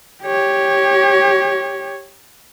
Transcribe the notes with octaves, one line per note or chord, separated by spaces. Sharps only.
G4 C#5